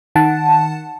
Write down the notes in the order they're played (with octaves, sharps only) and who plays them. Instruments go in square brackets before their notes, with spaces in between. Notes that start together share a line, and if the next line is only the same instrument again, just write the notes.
[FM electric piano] D#3 F#5 A5